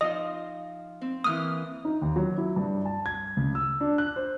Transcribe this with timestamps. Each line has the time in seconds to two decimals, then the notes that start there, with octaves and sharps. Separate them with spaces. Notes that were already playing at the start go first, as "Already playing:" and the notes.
0.01 F3 D#4 F4 D#5 D#6
1.01 C4
1.24 E3 A#3 D#6 F6
1.85 D#4
2.02 D#2
2.16 F#3
2.37 E4
2.56 G2
2.85 A5
3.06 G#6
3.37 C#2
3.55 E6
3.81 D4
3.98 F#6
4.16 C5